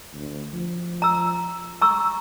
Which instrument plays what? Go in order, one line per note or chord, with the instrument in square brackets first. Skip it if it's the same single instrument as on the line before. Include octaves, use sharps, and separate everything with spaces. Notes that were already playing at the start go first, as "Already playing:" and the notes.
[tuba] D2
F3
[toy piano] A#5 E6
A#5 C#6 E6